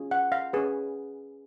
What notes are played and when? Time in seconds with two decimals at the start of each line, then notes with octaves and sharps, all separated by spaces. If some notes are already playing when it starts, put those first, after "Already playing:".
Already playing: C#4 F4 G#4
0.11 F#5
0.32 F5
0.53 C#4 G#4 B4